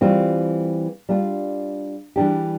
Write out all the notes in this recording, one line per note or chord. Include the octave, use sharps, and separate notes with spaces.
E3 G3 C4 F4
G3 D4 F4
E3 G3 D4 G4